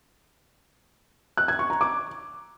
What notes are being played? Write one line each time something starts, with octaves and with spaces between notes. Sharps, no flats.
F#6
G#6
C#6
A#5
D6